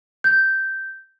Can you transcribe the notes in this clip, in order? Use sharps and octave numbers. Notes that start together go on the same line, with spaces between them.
G6